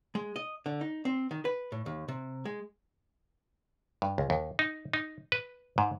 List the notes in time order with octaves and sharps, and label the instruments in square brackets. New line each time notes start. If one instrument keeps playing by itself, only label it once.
[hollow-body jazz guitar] G#3
D#5
D3
D#4
C4
D#3
B4
A2
D#2
C3
G#3
[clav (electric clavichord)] G2
C#2
D#2
D#4
D#4
B4
G#2